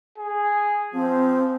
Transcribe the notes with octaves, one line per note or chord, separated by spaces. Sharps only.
G#4
F3 C4